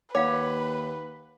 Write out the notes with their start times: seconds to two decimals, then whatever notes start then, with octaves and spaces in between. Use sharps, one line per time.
0.15 D#2 B4 C#5 F5 F#5 D6